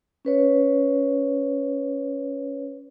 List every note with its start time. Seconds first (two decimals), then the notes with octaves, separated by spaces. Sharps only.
0.25 C#4 B4 C#5